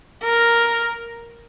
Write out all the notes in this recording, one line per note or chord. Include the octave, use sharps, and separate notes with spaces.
A#4